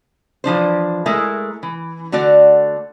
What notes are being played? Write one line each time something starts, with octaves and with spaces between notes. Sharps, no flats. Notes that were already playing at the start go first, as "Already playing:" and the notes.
E3 F3 D4 C5
G#3 A3 E4 A#4 E5
E3
D3 A3 F#4 D5 A5